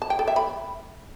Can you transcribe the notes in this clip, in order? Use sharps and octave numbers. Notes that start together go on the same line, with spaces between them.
A5
G5
A4
E5
B5